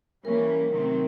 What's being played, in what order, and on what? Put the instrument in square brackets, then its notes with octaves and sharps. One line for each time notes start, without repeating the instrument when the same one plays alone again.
[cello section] E3 G3 A#3 C#4 [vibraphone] A#4
[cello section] C3 D#3 F#3 A3 C4